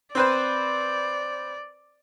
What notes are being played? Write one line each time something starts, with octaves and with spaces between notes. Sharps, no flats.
C4 B4 C5 D5